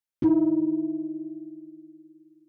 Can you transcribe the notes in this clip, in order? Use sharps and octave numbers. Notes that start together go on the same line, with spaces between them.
D#4 E4